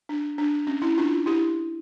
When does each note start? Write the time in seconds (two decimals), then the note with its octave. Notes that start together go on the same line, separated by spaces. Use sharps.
0.09 D4
0.38 D4
0.67 C#4
0.82 C#4 E4
0.98 D4 F4
1.26 E4 G4